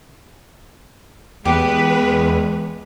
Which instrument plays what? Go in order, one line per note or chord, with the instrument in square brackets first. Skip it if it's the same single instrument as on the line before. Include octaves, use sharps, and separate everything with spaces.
[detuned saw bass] E2 [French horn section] G#3 [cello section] B3 B4 [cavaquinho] G4